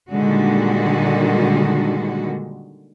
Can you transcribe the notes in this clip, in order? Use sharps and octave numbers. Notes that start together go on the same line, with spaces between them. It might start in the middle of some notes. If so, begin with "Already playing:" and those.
A#2 D3 D#3 G3 G#3 F#4